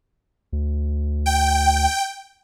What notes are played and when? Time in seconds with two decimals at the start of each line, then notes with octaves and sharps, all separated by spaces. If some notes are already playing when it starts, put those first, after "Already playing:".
0.53 D2
1.26 G5